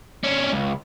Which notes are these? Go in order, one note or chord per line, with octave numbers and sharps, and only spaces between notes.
C#4 D4
C#2